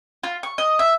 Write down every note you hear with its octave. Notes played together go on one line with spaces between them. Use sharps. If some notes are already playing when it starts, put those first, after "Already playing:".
F4
C#6
D#5
E5